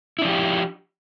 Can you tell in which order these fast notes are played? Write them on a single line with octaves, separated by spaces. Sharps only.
E4 D4 F3 G4